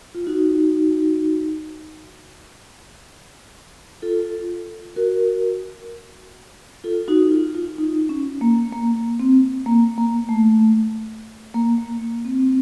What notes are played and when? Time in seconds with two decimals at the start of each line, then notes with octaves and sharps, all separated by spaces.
0.15 F4
0.27 D#4 F#4
4.02 F4 A4
4.96 F#4 A#4
6.84 F4 A4
7.08 D#4 F#4
7.31 F4
7.55 F4
7.78 D#4
8.09 C#4
8.41 A#3
8.72 A#3
9.20 C4
9.66 A#3
9.98 A#3
10.29 A3
11.54 A#3
11.78 A#3
12.25 C4
12.40 C4